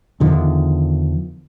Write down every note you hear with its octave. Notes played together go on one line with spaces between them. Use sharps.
E2 D3 D#3 F3